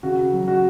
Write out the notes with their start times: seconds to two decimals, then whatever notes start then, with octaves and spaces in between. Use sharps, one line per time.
0.03 C#3 F#4
0.33 F#3
0.48 F#4